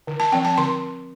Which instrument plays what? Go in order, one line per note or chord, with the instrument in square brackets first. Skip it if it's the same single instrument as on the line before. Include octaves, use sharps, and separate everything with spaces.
[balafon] D3
A5
F3 C4 G5
A5
D3 C6